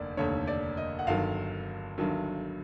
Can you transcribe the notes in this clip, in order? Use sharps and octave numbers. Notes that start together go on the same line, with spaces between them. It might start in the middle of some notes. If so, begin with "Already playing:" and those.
Already playing: F1 D#2 D3 D5
F1 D#2 D3 C#5
D5
D#5
F#5
G1 G2 D#3 F#3 F5
G1 G2 D#3 F#3